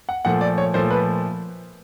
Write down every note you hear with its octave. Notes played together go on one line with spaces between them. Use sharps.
F#5
A#2 F3 A3 F#5
D5
C#5
A#2 F3 A3 C5
B4